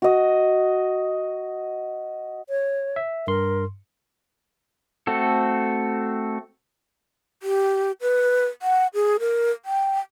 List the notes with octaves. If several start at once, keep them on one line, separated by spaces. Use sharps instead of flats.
F#4 D#5
C#5
E5
G2 A#4 C6
A3 C4 F#4 A4
G4
B4
F#5
G#4
A#4
G5